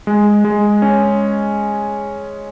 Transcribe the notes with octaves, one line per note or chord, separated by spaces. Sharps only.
G#3
G#3
C#4